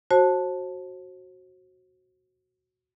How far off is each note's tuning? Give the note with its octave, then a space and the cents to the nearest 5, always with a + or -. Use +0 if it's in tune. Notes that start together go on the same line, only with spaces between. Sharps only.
F#4 +0 C5 +35 A5 +0